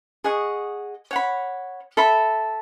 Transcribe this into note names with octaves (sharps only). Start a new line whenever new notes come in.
G#4 D#5 F#5 C#6
C#5 F#5 B5
A4 E5 B5